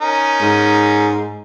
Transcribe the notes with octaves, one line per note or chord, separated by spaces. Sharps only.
C#4 D#4 A#4
G#2